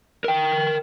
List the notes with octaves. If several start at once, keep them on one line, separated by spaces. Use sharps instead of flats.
A#4 G5